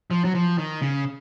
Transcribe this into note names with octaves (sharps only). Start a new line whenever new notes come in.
F3
F#3
F3
D#3
C#3